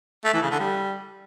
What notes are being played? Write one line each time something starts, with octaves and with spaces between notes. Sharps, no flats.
A3
E3
C#3
D3
G3